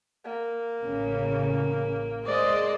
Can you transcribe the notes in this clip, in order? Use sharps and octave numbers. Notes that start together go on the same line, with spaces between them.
A#3
A1 C#3
G#3 C5 D5 D#5